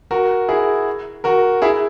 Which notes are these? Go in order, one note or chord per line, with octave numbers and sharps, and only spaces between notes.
F#4 A#4
E4 G#4
F#4 A#4
E4 G#4